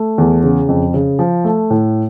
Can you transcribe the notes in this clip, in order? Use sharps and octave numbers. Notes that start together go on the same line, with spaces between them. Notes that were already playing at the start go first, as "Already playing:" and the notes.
Already playing: A3
E2
C#3
F2
C#3
F3
A3
A2